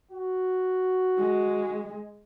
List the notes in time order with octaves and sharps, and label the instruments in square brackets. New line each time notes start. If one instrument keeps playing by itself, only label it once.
[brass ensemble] F#4
[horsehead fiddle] G#3